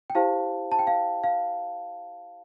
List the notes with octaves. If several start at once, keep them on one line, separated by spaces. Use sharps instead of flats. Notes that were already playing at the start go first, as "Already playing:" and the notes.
G5
E4 G4 C5 F5 A5
A5
G5
F5
F5